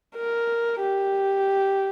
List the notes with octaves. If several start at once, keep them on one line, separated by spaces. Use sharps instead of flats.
A#4
G4